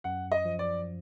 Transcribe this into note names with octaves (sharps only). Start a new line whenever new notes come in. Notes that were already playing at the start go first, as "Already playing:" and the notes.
F#2 F#5
D#5
F3
D5